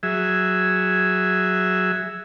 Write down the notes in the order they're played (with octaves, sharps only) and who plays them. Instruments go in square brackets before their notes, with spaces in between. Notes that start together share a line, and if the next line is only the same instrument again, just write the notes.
[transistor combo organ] F#3 G#4 E5